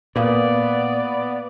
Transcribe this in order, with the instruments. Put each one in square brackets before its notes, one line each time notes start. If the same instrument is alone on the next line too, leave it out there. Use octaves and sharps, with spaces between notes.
[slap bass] A#2 [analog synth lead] B3 [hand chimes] B4 F5 D#6 [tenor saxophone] D5